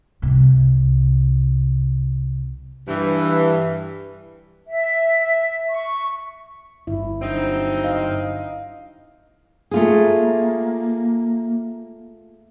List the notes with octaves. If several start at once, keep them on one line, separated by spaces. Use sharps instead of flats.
C2 C3
G2 E3
E5
C#6
G1 E4
F#3 C4 D4 D#4
D#5 F5
A3 A#3 F4 G#4